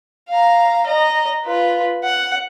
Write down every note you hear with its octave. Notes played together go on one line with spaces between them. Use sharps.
F5 A#5
D#5 A#5
F4 B4
F#5